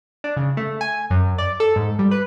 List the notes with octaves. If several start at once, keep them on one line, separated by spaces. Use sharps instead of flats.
D4
C#3
A3
G#5
F#2
D5
A4
G#2
G3
B4